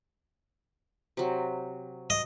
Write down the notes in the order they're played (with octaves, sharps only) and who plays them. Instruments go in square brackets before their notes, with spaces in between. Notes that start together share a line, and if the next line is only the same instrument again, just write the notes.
[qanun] C3 F#3
[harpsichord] D#5